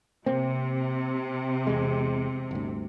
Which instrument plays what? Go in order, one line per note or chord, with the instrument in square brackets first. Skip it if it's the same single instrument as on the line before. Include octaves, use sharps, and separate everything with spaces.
[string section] C3 [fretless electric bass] A#3 C4
[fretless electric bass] E2 G#3
G1 D2